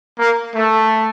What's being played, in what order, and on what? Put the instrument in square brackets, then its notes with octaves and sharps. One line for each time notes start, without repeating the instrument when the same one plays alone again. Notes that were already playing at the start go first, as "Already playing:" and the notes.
[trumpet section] A#3
A3